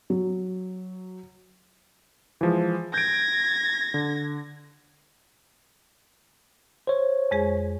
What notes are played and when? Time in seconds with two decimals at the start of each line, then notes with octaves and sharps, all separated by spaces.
0.10 F#3
2.41 E3 F3 G#3
2.94 G6 G#6 A#6 D7
3.94 D3
6.87 C5 C#5
7.31 F2 G#3 G#4